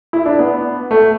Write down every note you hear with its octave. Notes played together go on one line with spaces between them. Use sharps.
E4
D4
B3
A3